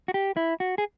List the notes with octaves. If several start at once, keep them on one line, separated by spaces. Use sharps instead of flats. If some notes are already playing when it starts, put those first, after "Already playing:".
F#4
G4
E4
F#4
G#4